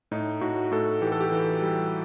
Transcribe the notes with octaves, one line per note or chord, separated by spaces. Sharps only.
A2 D#4
A2 F#4
A2 A4
E3 G4
A4
G4
E3
G3